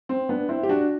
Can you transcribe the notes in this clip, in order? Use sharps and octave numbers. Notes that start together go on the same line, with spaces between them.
C4
B3 D4
C4 E4
G4
D4 F#4